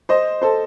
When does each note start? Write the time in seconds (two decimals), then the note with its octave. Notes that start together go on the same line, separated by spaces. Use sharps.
0.09 C5 D#5
0.42 A4 C5